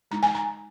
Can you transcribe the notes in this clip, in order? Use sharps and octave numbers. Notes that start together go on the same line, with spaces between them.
G#3 D#4 A#5
G#5
A#5